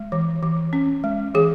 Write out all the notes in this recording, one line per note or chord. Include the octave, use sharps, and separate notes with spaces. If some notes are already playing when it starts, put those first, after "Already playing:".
Already playing: G#3
E3
E3
C#4
G#3
E3 G#4